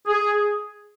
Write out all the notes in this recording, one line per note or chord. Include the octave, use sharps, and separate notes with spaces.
G#4